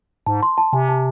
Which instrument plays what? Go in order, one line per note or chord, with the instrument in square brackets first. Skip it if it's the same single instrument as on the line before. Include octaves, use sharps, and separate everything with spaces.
[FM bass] G#2 [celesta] A5
[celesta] C6
A5
[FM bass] C3 [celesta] G#5
[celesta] A5